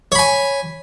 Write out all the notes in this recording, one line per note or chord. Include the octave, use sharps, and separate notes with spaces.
C#5 G#5 B5